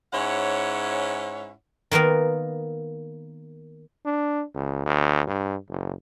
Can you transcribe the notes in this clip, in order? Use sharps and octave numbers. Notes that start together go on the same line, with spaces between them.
G#2 C#4 E4 C#5 F#5
D#3 A#3 B3 A#4
D4
C#2
D2
G2
F#1